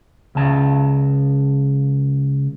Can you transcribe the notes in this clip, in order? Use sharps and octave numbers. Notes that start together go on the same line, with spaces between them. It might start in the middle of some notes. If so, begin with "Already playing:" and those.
C#2 A5